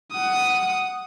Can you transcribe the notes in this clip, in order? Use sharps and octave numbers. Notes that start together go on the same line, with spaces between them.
F#5 D#6